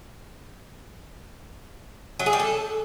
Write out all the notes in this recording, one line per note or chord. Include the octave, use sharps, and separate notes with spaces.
F#3
G#4
G3
A4